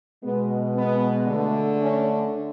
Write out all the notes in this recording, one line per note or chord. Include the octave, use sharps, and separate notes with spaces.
B2 G#3 B3
B3
D3 A3
C#4